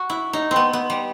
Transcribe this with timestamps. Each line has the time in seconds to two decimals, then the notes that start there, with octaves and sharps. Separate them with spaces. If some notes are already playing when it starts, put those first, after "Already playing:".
Already playing: F#4
0.10 E4
0.33 D#4
0.51 B3 C4
0.73 B3
0.90 G3